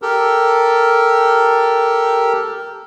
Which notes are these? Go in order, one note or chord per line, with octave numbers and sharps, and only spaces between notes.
G4 A4 A#4